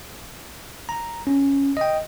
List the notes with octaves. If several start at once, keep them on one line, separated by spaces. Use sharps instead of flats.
A#5
C#4
D#5 G5